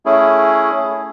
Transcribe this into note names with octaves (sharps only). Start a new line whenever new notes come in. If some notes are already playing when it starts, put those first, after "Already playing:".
A3 C#4 E4 G#4